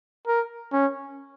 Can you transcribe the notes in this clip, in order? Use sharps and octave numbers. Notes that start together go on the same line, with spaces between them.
A#4
C#4